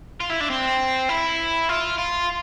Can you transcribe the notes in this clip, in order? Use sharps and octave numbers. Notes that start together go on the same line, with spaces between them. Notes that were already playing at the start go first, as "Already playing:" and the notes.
F4
E4
D4
C4
E4
F4
F4